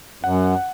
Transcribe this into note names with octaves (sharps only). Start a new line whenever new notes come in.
F#2 F#5